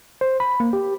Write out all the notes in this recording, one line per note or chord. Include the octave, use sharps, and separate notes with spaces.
C5
B5
A#3
G4